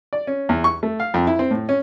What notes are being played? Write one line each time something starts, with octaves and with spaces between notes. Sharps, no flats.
D5
C#4
E2
C#6
A3
F5
F2
E4
C4
A2
C#4